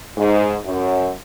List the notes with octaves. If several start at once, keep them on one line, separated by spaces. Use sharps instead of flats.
G#2
F#2